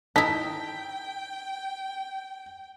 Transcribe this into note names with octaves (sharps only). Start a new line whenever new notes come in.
D#4 E4 G5 A5 B6